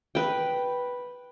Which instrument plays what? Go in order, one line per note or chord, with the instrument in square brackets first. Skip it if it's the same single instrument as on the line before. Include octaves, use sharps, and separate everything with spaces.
[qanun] B4 G5